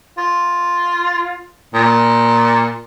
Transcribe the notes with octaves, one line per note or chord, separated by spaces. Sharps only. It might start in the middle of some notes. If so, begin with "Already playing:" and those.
F4
A#2